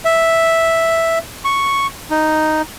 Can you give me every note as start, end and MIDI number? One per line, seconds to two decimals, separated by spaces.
0.05 1.19 76
1.45 1.87 85
2.10 2.62 63